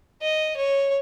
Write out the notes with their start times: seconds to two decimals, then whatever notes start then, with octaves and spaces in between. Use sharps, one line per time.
0.22 D#5
0.57 C#5